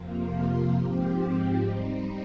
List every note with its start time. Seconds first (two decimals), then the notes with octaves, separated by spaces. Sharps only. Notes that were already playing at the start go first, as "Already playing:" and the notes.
Already playing: F2 C3 F3 A#3 F4
0.73 G#2 F3 C4 G4
1.60 G3 C4 D#4